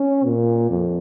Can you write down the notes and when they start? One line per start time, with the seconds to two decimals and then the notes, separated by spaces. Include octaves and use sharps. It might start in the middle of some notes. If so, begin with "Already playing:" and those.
Already playing: C#4
0.25 A#2
0.70 F2